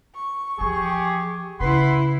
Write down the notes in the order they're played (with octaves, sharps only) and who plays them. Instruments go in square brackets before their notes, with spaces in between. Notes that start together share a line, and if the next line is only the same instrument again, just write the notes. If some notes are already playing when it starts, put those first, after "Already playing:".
[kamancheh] C#6
[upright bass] E2 F3 [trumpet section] G4 G#4
[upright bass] C#3 [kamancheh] E4 B4 [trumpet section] F#5 B5 C6